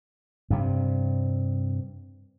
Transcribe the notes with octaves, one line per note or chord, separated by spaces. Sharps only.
G2 C3